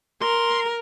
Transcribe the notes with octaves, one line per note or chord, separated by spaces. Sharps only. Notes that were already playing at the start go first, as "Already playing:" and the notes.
A#4 C6